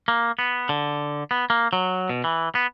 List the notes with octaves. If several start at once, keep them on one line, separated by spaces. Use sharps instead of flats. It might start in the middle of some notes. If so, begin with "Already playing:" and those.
A#3
B3
D3
B3
A#3
F#3
B2
E3
B3